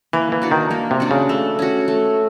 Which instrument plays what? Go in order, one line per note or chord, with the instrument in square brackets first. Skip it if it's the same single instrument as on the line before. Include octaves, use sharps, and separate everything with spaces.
[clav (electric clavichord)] E3 [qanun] A#3
[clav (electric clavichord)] E3
[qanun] D4 F#4
[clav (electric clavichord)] D#3
[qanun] A#3
[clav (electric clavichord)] C3
[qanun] D4 F#4
[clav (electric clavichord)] C#3
[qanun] A3
C#4 F#4
A3